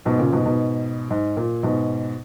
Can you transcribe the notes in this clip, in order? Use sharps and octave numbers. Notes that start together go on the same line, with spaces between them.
G#2 B2
A#2 C#3
G#2 B2
G#2 B2
G#2
A#2
G#2 B2